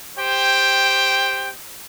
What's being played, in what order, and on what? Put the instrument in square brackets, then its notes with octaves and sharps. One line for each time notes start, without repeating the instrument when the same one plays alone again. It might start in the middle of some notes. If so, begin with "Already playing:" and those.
[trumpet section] G4 C5 G5